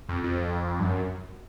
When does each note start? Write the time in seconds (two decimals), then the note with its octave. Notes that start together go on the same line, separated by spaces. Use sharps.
0.09 F2
0.23 F2
0.79 G2
0.85 F#2